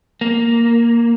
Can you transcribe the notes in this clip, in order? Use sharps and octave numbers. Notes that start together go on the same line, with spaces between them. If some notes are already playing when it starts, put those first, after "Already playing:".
A#3